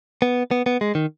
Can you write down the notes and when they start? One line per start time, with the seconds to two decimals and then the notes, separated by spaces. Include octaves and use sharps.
0.22 B3
0.51 B3
0.66 B3
0.81 G#3
0.95 D#3